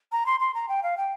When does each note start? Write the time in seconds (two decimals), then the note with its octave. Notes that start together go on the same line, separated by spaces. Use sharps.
0.12 A#5
0.26 C6
0.40 C6
0.54 A#5
0.68 G5
0.83 F5
0.97 G5